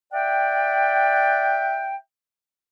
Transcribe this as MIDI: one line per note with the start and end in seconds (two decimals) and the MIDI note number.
0.13 1.96 74
0.13 1.96 76
0.13 1.96 78
0.13 1.96 79